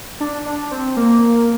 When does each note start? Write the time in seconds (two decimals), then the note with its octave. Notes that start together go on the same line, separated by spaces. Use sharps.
0.20 D4
0.46 D4
0.71 C4
0.97 A#3